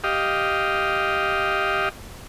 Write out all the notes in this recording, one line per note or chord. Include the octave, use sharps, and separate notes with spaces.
G4 D#5 F5